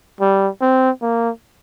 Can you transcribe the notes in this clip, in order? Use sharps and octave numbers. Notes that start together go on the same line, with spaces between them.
G3
C4
A#3